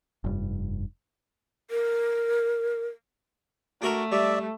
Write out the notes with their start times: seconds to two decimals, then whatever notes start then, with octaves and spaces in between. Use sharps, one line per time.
0.24 F1 G2
1.71 A#4
3.82 A3 D4 F#4 A#4
4.12 G3 D5 E5